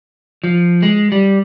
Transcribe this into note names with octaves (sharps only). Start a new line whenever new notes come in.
F3
G#3
G3